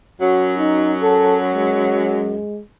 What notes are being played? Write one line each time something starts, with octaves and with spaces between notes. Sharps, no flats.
F#2 F#3 F#4
D#4
A4
G#3